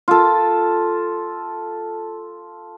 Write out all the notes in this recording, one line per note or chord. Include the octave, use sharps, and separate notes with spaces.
F4 A4